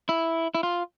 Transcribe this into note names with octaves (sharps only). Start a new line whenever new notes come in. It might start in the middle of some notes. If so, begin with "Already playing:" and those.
E4
E4
F4